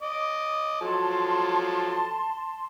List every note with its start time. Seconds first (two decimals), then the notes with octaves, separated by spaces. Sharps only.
0.02 D#5 D6
0.81 F3 F#3 A4 A5 C6